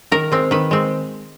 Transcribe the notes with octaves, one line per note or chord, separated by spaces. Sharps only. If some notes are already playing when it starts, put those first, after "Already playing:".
D#3 A#4
G#3 C4
D#3 B4
G#3 C4